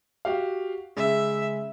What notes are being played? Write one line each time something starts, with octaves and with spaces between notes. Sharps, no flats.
F#4 G4 F5
C#3 G#3 E5